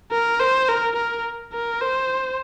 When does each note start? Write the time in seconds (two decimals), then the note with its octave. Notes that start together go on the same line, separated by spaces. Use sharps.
0.12 A#4
0.40 C5
0.68 A#4
0.96 A#4
1.53 A#4
1.81 C5